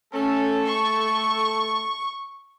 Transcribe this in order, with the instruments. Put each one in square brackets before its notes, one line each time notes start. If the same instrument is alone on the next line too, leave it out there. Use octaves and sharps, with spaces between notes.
[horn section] A3 A4 [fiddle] C#4
[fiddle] C#6